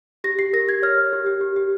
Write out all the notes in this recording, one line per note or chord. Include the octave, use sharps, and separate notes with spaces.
G4 A#6
G4 C7
A#4 A#6
G4 G#6
C#5 F6
C#5
G4
G4
G4
G4